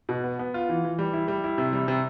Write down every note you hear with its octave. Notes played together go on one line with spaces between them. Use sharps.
B2
B3
B3
F4
E3
E3
G3
E4
G3
E4
C3
G3
C3